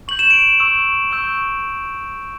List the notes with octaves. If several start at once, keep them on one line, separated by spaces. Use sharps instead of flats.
C#6 G6 F#7
E7
D7 F#7
C#6 E6 G6
C#6 E6 G6